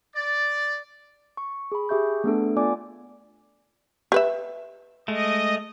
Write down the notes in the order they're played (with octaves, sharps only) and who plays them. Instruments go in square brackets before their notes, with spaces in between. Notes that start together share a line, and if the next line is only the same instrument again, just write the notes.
[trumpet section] D5
[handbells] C#6
G#4 B5
G4 G#4 E5 C#6 G6
A3 B3 D4 A4
B3 F4 D5 G#5 D6
[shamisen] G4 B4 E5
[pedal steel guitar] G#3 A3 [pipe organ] D#5